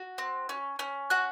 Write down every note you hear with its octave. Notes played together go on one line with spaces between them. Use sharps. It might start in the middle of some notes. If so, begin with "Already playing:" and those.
Already playing: F#4
C4
C#4
C#4
F#4 F#6